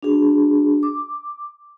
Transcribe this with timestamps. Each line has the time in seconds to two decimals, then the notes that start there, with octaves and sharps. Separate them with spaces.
0.03 D4 F#4 G#4
0.83 D6